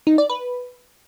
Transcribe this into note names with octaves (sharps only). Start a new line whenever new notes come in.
D#4
D5
B4